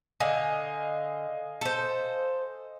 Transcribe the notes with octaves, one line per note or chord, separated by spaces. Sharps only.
D3 D#5 F5 G#5
A4 C5